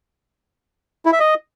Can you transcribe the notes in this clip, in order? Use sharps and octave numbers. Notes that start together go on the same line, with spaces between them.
E4
E5
D#5